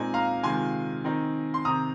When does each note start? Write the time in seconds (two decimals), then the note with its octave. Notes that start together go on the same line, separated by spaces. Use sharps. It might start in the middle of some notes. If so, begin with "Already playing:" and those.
Already playing: A#2 G#3 C4 D#4 G#5
0.14 F5 A#5
0.43 C3 D#3 G#3 F4 G#5 C6
1.04 D#3 C4 D#4
1.54 C6
1.65 C3 D#3 C4 A#5 D#6